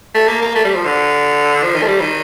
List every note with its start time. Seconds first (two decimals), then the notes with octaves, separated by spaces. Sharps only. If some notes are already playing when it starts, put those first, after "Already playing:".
0.15 A3
0.28 A#3
0.42 A#3
0.55 A3
0.64 G3
0.75 F3
0.85 D3
1.63 F3
1.75 D#3
1.82 A3
1.87 G3
2.01 D#3